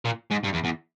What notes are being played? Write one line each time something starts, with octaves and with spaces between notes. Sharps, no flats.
A#2
G#2
G2
E2
E2